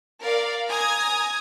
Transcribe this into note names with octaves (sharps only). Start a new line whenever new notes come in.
A#4 D5 F5
G#5 A#5 D#6 G#6